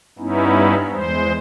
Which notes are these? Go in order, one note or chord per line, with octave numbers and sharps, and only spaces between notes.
G2 B3 C#4 D#4 E4
E2 G#3 C5